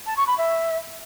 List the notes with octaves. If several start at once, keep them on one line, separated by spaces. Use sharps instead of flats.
A5
C#6
B5
E5